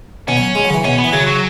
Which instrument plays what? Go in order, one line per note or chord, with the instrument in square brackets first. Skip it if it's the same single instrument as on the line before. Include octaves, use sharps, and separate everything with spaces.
[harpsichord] B2 [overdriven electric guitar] C#4
[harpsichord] F#3
G#3
F#3
C#3
E3
[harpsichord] B2 [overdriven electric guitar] C#4
[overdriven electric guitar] B3
[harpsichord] E3
[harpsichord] C#3 [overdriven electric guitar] F#3
[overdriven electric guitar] F#3